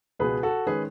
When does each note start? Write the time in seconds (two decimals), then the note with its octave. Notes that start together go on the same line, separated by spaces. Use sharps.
0.19 C#2 B2 G#3 G#4 B4
0.43 F#4 A4
0.67 D#3 G#3 C#4 G#4 B4